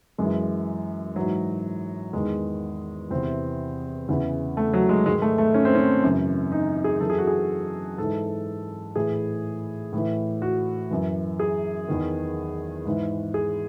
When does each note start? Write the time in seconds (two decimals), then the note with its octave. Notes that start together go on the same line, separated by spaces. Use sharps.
0.18 F#2 E3 G#3
1.16 G#2 E3 F#3
2.13 E2 D#3 G#3
3.11 E2 C3 E3 C4
4.09 E2 C#3 E3
4.57 A3
4.73 F#3
4.89 G#3
5.06 G#2 D#3 G#3
5.22 A3
5.38 A3
5.54 C#4
5.65 C4
5.75 C#4
6.03 F#2 C#3 E3
6.52 D#4
6.84 G#4
7.01 F#2 E3 A4
7.10 G#4
7.18 F#4
7.27 G#4
7.98 G#2 E3 A4
8.96 A2 E3 G#4
9.93 A2 E3
10.42 F#4
10.91 F#2 E3
11.40 G#4
11.88 E2 D#3
12.86 G#2 E3
13.34 G#4